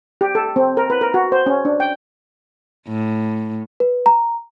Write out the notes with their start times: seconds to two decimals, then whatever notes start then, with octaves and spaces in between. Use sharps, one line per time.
0.21 G4
0.35 A4
0.56 C4
0.77 A#4
0.90 B4
1.01 A#4
1.14 F#4
1.32 C5
1.46 C#4
1.65 D4
1.80 G5
2.89 A2
3.80 B4
4.06 A#5